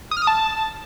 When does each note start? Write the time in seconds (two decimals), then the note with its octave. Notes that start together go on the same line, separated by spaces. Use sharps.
0.11 D#6
0.17 F6
0.22 D#6
0.27 A5